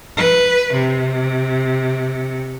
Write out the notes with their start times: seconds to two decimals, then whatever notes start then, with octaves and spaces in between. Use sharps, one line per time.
0.17 B4
0.74 C3